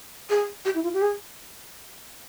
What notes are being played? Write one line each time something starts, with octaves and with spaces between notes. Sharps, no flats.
G#4
G4
E4
F4
G4
G#4